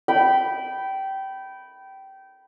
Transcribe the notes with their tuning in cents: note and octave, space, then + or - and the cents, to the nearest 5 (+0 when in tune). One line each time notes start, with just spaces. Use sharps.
G5 -20 B5 +0